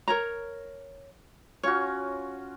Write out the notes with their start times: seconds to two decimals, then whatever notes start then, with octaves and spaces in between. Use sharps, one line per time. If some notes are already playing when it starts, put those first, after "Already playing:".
0.08 A#4 C#5 A#5
1.63 C#4 F4 F#4 C#5